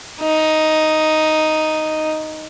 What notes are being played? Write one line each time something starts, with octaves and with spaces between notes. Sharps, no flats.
D#4